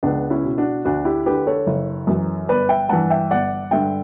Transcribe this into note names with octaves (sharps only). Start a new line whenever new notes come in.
C#2 B3 D4
C#4 E4
B2
D4 F#4
D2 D4 F#4
E4 G4
D3 G4 B4
A4 C#5
F#1
F#2 E3
G1 B4 D5
E5 G5
G2 E3 F#5 A5
E5 G5
G1 D5 F#5
G2 D3 E5 G5